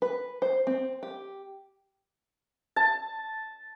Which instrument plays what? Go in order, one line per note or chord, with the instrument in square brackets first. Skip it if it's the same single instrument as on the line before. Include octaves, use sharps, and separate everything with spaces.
[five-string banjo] B4
C5
C4
G4
[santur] A5